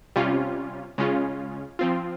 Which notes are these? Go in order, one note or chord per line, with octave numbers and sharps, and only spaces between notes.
C3 G3 C#4 F4
C#3 G#3 C#4 F4
F3 C4 F4